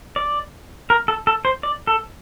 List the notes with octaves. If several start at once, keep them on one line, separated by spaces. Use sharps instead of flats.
D5
A#4
A4
A4
C5
D5
A4